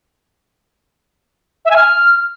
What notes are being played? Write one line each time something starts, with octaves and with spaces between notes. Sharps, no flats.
E5
G#5
F6